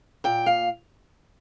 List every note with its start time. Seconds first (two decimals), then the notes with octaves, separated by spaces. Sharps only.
0.24 A#2 G5
0.46 F5